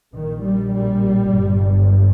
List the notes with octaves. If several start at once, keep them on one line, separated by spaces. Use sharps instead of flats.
A#1 A#2 D#3
G3
G3
G1 G2